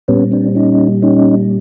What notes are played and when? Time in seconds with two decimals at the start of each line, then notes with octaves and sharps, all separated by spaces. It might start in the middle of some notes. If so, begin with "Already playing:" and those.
0.08 A#2 G3 B3 C#4
0.31 C4 D4
0.55 C#4 D#4
1.02 C#4 D#4